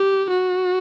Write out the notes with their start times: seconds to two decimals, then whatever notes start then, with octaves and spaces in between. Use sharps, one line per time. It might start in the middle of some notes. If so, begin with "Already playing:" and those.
Already playing: G4
0.30 F#4